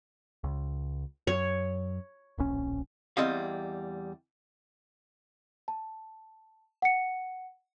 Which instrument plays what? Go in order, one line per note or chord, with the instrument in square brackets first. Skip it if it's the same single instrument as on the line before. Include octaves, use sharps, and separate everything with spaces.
[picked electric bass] C#2
[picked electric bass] F#2 [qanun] C#5
[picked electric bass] D1 A#1 C#4
[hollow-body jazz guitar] E2 G3 C4 D#5 F5
[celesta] A5
F#5 C#7